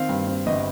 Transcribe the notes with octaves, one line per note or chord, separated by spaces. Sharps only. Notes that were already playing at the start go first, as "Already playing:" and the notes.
Already playing: D#3 C4 F5
G2
C4
G1 D#5